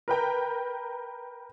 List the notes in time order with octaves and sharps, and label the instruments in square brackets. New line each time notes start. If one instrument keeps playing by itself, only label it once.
[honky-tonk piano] A#4 B4 G5 A#5